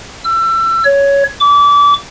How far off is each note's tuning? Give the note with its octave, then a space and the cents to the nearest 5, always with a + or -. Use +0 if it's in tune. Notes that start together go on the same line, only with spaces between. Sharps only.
E6 +30
C#5 +10
D6 -30